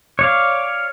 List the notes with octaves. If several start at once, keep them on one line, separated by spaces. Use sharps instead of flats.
C#5 D5 F5